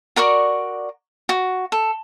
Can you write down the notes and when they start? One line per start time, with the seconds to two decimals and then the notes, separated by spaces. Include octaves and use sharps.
0.16 F#4 A#4 D5 C#6
1.29 F#4
1.72 A4